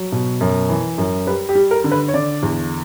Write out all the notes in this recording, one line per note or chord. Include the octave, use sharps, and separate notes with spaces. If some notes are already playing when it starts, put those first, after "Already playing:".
Already playing: F#3
B2
F#2
E3
F#2
G3 B4
G4
G3
A#4
D3
B4
C#5
D3 D5
E2